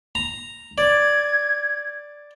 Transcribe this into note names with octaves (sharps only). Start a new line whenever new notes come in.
A#5
D5 G#6